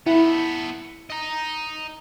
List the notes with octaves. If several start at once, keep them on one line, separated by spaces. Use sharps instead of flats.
B3 E4 A4
D#5 A#5